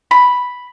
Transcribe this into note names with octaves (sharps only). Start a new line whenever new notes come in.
B5